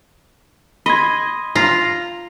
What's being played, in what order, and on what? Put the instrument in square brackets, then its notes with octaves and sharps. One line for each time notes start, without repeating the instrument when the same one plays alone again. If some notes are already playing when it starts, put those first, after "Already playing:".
[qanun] D#5 [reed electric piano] B5 C6 G#6
[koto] F4 [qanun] A#5